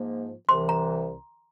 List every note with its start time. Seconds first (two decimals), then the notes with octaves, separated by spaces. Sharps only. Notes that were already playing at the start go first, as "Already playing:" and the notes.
Already playing: G#2 F3 A#3
0.49 C2 C3 E3 C6
0.69 A#5